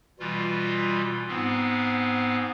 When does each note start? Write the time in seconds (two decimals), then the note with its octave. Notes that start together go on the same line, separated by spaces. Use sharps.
0.20 B2 E3 G3 F4
1.28 G#2 B3 C4